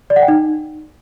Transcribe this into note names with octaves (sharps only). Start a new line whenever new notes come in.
D5
F#5
G5
D#4